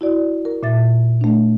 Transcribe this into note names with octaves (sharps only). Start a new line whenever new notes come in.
E4 F#4 D5
A#4
A#2 E5 A6
A3 D4